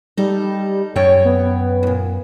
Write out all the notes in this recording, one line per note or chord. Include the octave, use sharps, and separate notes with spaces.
G3 D#4 A4
F#2 C#5 G5
B3
D2 A#2